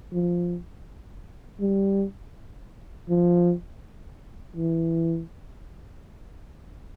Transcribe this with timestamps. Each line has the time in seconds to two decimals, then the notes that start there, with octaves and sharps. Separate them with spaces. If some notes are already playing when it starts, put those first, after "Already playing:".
0.13 F3
1.60 G3
3.09 F3
4.56 E3